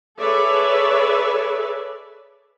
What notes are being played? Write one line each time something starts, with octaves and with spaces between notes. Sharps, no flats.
G#4 A4 B4 C#5 D5 E5